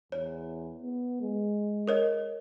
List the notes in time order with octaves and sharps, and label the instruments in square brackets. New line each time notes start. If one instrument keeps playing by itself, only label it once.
[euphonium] E2 [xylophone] C#5
[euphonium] B3
G#3
[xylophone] A#4 C#5 D#5